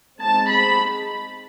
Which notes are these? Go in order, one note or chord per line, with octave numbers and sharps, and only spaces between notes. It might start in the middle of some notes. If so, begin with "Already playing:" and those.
G#3 C4 D#4 A5
B5